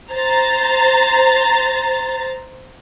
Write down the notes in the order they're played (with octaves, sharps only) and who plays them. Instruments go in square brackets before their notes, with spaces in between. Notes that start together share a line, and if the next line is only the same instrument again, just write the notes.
[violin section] C5 A#5 A6